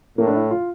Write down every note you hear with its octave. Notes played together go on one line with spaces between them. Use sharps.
A2 A#3
D4
E4
F4